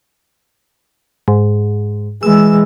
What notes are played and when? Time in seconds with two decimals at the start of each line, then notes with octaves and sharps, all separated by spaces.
1.28 G#2
2.23 E3 G#3 E6